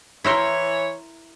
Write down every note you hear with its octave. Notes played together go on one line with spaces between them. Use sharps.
E3 E4 A#4 C5 C#5